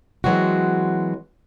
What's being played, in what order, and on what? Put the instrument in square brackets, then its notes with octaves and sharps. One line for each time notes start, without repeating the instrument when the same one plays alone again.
[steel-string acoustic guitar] E3 F#3 G#3 C4 F#4